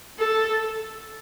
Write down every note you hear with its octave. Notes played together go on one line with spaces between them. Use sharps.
A4